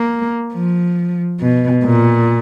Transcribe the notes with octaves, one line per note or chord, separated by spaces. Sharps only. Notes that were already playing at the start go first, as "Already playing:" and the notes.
Already playing: A#3
F3
B2
A#2